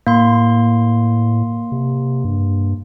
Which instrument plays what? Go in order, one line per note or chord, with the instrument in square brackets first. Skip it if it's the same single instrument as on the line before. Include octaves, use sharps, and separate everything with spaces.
[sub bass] A2 [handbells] A#3 C6
[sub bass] C3
G2